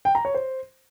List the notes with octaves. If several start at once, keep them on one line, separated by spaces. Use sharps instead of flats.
G5
A#5
C#5
C5